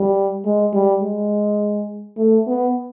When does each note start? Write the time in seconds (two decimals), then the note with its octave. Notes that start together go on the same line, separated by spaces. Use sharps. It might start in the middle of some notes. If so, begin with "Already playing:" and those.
Already playing: G3
0.45 G#3
0.73 G3
1.03 G#3
2.17 A3
2.47 B3